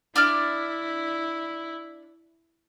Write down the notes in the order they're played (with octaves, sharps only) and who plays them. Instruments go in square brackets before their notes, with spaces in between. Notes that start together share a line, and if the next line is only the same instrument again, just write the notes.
[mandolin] D4 D5 F6 [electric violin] E4